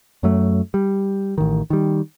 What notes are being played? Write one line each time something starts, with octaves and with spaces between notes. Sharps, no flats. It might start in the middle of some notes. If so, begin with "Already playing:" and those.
F#2 F#3 A3
G3
A1 D#3
D#3 G3